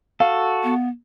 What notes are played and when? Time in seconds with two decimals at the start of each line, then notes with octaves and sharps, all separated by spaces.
0.20 F#4 A4 F5
0.64 B3